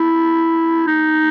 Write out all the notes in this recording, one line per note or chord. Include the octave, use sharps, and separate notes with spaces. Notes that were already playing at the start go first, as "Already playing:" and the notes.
Already playing: E4
D#4